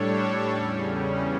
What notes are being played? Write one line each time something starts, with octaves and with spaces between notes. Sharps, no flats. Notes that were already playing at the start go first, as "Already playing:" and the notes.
Already playing: A2 G3 D4 A4 C#5
E2 C#3 G3 C#4